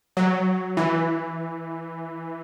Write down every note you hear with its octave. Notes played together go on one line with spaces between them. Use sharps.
F#3
E3